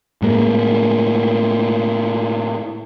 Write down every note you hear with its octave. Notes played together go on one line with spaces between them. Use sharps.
A2 G#3 A#3